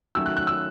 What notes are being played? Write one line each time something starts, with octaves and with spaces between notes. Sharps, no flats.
D#3 F#3 A3 C#4 E6
F#6
F#6
E6